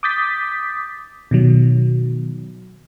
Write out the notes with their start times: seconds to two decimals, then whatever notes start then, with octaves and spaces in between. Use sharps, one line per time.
0.03 D6 D#6 G6 A6 B6
1.31 B2 D#3 F#3